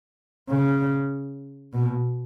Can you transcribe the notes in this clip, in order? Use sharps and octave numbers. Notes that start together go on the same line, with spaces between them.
C#3
B2